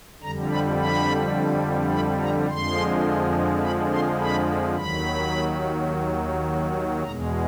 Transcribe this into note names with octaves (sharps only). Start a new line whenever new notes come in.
F2 D3 G3 A#5
B5
B5
B5
A#5
F2 D3 F3 G#3 C6
B5
C6
B5
D#2 D#3 F#3 B5
E2 B2 G#3 A#5